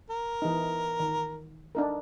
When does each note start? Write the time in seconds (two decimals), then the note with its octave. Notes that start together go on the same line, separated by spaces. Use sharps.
0.10 A#4
0.42 E3 D#4
1.00 D#3
1.75 D4 D#4 A#4